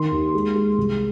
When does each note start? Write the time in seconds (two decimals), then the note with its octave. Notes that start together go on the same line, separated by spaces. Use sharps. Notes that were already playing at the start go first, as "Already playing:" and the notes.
Already playing: D#3 C6
0.12 D#2
0.34 G#3
0.55 G#3
0.78 C2